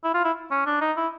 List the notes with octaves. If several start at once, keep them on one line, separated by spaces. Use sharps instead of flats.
E4
F4
E4
C#4
D4
D#4
E4